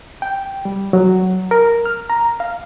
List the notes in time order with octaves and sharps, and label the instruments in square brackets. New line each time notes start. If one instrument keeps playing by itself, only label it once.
[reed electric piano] G5
G3
F#3
A#4
F6
A#5
F5